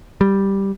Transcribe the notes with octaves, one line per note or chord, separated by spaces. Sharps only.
G3